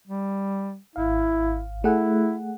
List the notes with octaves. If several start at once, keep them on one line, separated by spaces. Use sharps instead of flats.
G3
G#1 E4 F5
A3 E4 G#4 F#5